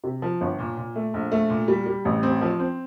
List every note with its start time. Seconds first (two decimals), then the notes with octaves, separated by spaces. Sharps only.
0.04 C3
0.22 F3
0.41 G1
0.59 A#2
0.77 A#2
0.96 A3
1.14 A#1
1.32 A3
1.50 A#2
1.68 G3
1.86 G3
2.05 A1
2.23 C4
2.41 F3
2.59 C4